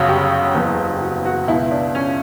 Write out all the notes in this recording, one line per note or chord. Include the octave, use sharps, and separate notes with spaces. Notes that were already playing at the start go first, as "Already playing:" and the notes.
Already playing: G1 F#2 C#3 F#4 C#5
G4
F#1 E2 C#3 E3
F#4
F#4
C#2 B2 E4
D4
C#4